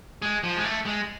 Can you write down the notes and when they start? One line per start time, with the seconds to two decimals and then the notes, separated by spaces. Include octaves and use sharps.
0.22 G#3
0.44 F3
0.57 G#3
0.64 A3
0.85 G#3